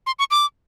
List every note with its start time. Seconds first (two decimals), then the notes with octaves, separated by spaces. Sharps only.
0.07 C6
0.19 C#6
0.31 D6